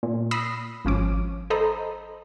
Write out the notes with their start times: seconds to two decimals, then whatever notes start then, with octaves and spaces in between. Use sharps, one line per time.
0.03 A#2
0.31 B5 D#6 E6 A#6 C7
0.85 G#1 F3 C#4 D6
1.50 A4 C5 D#5 A#5 B5